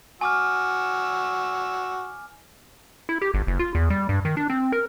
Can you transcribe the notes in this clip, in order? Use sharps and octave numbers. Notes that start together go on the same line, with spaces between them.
F#4 G#5 D6 E6 F6
E4
G4
G1
F#1
F4
E2
G3
G2
D#3
D4
C4
A#4